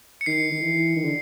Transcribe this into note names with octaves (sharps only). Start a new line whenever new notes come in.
C#7
D#3 C7
D#3
E3
D#3
D3